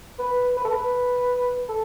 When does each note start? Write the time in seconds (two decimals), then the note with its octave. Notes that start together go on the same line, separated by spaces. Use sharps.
0.19 B4
0.57 B4
0.65 A4
0.72 B4
1.69 A4